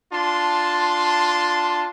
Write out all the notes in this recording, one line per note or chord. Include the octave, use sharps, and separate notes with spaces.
D4 F4 A5 C6